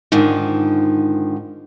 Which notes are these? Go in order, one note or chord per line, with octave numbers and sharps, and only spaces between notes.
G#2 D3 D#3 F3